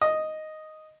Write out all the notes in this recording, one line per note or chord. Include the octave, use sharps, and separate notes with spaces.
D#5